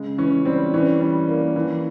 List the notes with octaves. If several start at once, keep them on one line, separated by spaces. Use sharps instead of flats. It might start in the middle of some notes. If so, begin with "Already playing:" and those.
Already playing: C#3 G#3
E3 C#4
G3 C4
E3 C#4
G3
A#3
E3